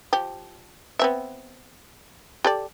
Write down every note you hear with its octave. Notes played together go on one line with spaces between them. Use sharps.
F3 G4
B3 C4 E5
G4 A4 D5